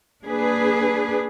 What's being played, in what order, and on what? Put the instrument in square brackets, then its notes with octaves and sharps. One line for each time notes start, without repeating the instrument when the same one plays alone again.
[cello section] A#3 D4 G#4 B4